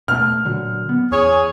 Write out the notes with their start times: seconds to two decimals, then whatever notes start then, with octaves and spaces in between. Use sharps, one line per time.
0.08 B2 A3 F6
0.45 A#2 D3 F#3
0.89 B3
1.11 E2 G#4 C#5